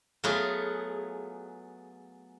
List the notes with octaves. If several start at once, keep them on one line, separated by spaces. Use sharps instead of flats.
F#3 A3 B3 F4 F#4 G#4